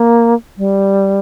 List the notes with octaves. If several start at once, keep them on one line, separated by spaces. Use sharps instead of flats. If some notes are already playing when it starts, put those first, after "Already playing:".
Already playing: A#3
G3